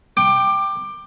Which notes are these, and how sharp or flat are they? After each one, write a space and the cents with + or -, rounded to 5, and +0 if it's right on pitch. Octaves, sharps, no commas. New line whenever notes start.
G5 +0 D6 +20